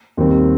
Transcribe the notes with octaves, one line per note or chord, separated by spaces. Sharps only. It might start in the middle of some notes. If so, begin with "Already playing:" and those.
D#2 D#3 G3 C4